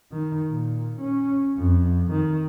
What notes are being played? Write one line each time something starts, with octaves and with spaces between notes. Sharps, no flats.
D#3
A#2
C#4
F2
D#3